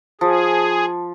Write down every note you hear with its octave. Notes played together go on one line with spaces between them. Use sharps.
F3 G#4